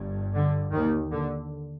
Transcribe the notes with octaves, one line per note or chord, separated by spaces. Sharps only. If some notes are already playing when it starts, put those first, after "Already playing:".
Already playing: G1 G2
D3
D#2 D#3
D3